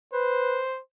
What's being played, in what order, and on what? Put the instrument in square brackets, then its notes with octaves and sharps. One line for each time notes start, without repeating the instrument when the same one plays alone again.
[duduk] B4 [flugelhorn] C5